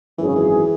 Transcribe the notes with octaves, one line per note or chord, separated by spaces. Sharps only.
G#1 F#2 E3 F#3 C#4 G#4
C#3
E3